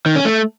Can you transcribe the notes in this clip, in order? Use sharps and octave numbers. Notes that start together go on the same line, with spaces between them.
D#3
C#4
A3